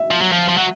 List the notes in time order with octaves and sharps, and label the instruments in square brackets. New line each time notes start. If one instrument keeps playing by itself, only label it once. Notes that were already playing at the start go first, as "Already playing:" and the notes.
Already playing: [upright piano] E5
[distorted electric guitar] F3
F#3
F3
F3
F#3